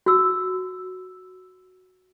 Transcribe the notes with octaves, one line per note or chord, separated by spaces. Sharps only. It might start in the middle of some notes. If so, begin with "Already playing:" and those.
F#4 E6